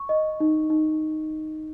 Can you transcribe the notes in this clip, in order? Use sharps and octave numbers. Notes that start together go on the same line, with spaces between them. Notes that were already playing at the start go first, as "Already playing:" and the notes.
Already playing: C#6
D#5
D#4
D#4